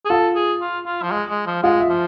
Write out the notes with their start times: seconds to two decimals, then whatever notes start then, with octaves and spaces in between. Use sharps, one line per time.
0.05 G#4
0.10 F4 A4
0.35 G#4
0.61 F4
0.86 F4
1.03 F3
1.12 G#3
1.30 G#3
1.47 F3
1.63 G#3 F4
1.80 E5
1.89 F3